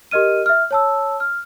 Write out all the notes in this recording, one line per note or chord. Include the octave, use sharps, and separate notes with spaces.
G4 A#4 D#5 F6 D#7
E5 F6
C#5 A5 E6
F6